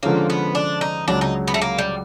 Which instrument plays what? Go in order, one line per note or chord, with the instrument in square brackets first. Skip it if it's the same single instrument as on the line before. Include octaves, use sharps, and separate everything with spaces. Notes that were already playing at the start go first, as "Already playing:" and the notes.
[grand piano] D3 F3 G#3 C#4 [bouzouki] A#3
[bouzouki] B3
D4
D#4
[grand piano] C#2 C#3 F#3 [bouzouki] D4
[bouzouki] D#4
B3
A3
A#3
G3